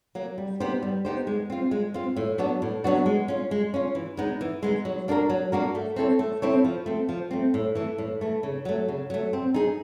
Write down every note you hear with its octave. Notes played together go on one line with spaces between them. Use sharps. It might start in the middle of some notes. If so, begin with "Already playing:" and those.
F#3 A#3
G3
B3 D#4 G4 C5
G3
B3 D#4 G4 C5
G#3
C4 F4
G#3
C4 F4
A2
F#3 B3 D4 F#4
A2
F#3 B3 D4 F#4
G#3
C#4 F4
G#3
C#4 F4
E3
G#3 B3 D#4
E3
G#3 B3 D#4
F#3
A#3 D4 F#4 A#4
F#3
A#3 D4 F#4 A#4
A3
C4 E4 A4 C#5
A3
C4 E4 A4 C#5
F3
A3 C4
F3
A3 C4
A2
E3 A3
A2
E3 A3
C#3
F#3 A3
C#3
F#3 A3
C4
D#4 G#4